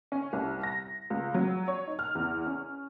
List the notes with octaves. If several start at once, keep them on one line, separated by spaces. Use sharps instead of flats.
C#4
C2
A#6
C#2
F#3
C#5
D#4
F6
E2
C#4